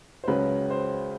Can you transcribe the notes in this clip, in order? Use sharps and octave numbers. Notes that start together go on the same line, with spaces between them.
C5
C#2 C#3 F#3 B4
C5